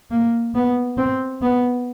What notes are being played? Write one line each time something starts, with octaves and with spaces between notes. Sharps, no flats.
A#3
B3
C4
B3